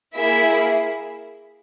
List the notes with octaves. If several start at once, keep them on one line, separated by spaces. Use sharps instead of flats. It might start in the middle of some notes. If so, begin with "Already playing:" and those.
A#3 E4 G#4 E5